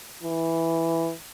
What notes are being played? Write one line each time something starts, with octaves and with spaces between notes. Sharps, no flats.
E3